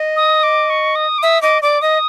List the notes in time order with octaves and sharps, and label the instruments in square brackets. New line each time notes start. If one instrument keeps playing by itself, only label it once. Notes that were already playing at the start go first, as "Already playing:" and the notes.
Already playing: [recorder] D#5
[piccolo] D#6
D6
C#6
D#6
D6
[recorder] E5 [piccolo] D#6
[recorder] D#5 [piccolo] D6
[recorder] D5 [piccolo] D6
[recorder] D#5 [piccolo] D#6